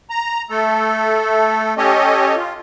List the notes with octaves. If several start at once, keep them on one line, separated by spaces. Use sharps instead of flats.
A#5
A3 A4
C#4 G4 A4 C#5 D#5
F4